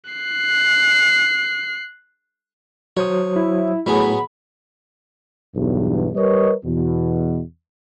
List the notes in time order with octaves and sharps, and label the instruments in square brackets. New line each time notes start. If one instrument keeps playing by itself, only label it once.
[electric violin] F#6 C7
[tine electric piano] F#3 C5 D#6 [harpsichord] C#5
[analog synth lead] E4
[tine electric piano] A2 [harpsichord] F#3 B3 G#4 [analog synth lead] B5
[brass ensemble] B1 E2 G2
G3 A#4 B4 C#5 D#5
E2 B2